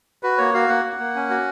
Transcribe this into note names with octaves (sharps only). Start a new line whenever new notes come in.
F#4 B4
A#3 C#5
F#4 F5
A#3 F#5
A#3
A#3
C#4
F#4